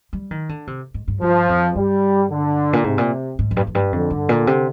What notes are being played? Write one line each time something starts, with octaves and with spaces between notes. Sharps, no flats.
G3
D#3
D3
C3
G#2
G2
G2 F3
F2
G2 G3
D3
A#2
G#2 C3
A#2
G#2
F2
G2
F2
G2
F2 D3
G2
A#2
C3